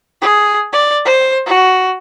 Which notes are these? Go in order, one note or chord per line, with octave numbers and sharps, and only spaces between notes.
G#4
D5
C5
F#4